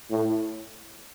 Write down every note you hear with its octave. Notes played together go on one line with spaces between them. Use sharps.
A2